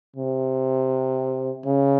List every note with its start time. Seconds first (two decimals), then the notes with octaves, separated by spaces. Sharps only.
0.16 C3
1.66 C#3